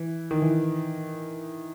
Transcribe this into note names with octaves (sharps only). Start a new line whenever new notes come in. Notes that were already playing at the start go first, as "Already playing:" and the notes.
Already playing: E3
D#3
E3